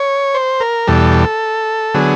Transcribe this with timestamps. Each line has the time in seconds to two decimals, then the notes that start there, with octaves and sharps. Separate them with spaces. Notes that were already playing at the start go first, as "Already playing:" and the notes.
Already playing: C#5
0.34 C5
0.60 A#4
0.87 E2 B2 G3 A4
1.94 D3 F#3 B3 G#4